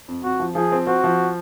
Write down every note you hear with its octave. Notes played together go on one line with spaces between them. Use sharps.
F2
F2 F#4
F3
F3 G#4
C4
C4 F#4
F3